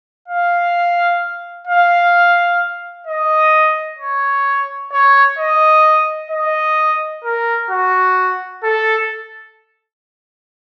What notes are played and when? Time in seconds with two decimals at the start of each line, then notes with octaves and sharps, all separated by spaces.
0.28 F5
1.67 F5
3.07 D#5
3.99 C#5
4.92 C#5
5.38 D#5
6.31 D#5
7.24 A#4
7.70 F#4
8.64 A4